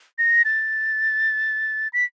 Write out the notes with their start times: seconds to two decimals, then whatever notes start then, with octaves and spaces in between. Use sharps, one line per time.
0.18 A#6
0.45 A6
1.93 B6